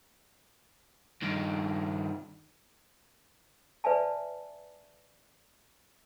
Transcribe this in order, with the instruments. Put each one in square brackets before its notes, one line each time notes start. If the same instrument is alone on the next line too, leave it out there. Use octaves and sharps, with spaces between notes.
[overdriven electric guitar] G2 D#3
[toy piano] B4 D5 E5 G#5 A5